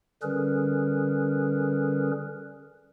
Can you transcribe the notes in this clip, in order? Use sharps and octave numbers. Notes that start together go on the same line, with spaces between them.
D3 G3 C#4 G#4 A#4 B4